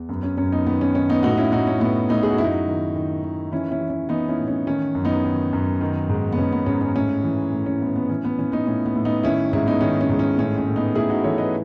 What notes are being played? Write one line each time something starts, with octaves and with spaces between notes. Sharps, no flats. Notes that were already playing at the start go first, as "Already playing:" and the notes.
Already playing: E2
F#2 B3
C#4
F#2 C#4
B3 D#4
D#3 B3
C#4
D#3 C#4
B3 D#4
A2 D#4 F#4
C#4 E4
A2 D#4 F#4
C#4
A2 B3
A2 B3 D#4
G#4
F#4
F#2 E4
D#4 F#4
D#3
D#3
D#3
E3 C#4 E4
C#4 E4
E3
C#4
E3 B3 D#4
C#4 E4
A2
C#4
D#3 C#4
F#2
B3 D#4
D#3
F#2
D#3
G#2
B3
G#2 C#4
B3
G#2 C#4
C#4
A2 C#4
E3
A2
C#4
A2 B3
B3
E3 C#4
B3
E3 C#4
B3 D#4
A2 C#4
B3
A2
B3 D#4
D#3 C#4 E4
G#2 C#4 E4
B3 D#4
D#3 C#4
C#4
G#2
C#4
A2 C#4
C#4
A2
B3 D#4
A2 E4 G#4
D#4 F#4
E3 A4 C#5
B4 D#5